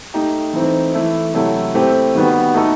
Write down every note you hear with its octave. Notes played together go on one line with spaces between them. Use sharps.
A3 D#4 G4
E3 A3 C4 D#4
E3 A3 E4
C3 F#3 A3 E4 A4
A3 C4 E4 G4
D#3 G3 B3 F#4
A3 D#4 F#4 A4